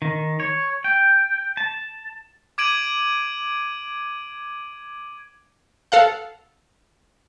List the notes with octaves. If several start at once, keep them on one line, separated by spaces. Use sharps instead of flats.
D#3
C#5
G5
A5
D6 G#6 D7 D#7 F#7
A4 F5 F#5